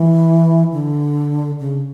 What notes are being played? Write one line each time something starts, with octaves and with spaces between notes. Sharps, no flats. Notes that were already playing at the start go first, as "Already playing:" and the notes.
Already playing: E3
D3
C#3